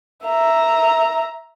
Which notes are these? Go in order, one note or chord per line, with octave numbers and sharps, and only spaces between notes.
E5 A#5